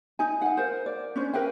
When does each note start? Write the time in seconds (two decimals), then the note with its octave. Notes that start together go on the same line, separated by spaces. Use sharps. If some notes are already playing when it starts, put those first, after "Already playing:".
0.19 D#4 G#5
0.41 F5 F#5
0.57 A#4 C5
0.86 D5
1.16 C#4 D4 C5
1.33 A#4 B4 F5 G5